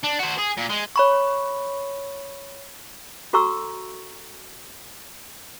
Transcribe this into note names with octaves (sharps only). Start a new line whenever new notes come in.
D4
F#4 C5
G#4
A#2
G#3
C#5 B5 C#6
F#4 A4 A#5 C#6 E6